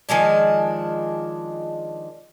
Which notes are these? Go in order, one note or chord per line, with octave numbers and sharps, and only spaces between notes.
D#3 F3 G#3 D4